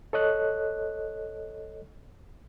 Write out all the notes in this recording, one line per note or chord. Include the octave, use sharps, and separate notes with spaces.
A4 C#5 D#5 F#6